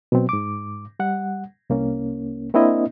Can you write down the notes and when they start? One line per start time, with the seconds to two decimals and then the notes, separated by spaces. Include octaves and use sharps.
0.12 B2 F#3 C4
0.29 G#2 D6
0.99 G3 F#5
1.70 C2 A#3 C#4
2.54 A#3 C4 D4 E4 D#5